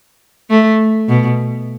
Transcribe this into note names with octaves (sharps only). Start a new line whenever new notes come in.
A3
B2